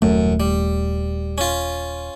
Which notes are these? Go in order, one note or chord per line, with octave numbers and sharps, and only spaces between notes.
D#1 F#2 A3
G3
C#4 F4